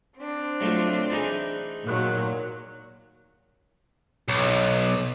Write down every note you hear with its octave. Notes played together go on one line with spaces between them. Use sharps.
C4 D4
F#3 A3 F4
E3 D#4 G#4
A#2 D#3 F#3
B1